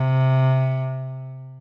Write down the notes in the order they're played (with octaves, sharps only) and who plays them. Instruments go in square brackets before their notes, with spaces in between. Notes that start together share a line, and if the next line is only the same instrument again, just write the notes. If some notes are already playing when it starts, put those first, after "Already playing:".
Already playing: [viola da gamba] C3